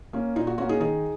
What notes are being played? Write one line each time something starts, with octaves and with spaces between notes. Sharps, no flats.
A#3 C#4
A#2 D#4
F#4
A#3 C#4 F#4
D#4 G#4
D#3 D#4 G#4